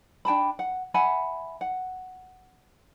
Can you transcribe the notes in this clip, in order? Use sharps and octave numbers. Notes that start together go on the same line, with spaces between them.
D4 G5 A5 B5
F#5
E5 F#5 G#5 B5
F#5